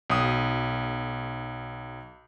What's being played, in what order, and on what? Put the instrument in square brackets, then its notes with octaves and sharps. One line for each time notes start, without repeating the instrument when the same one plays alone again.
[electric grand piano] B1 D#6